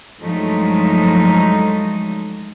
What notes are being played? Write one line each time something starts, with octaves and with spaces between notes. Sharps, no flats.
G2 F3 F#3 G#3 A3 D#4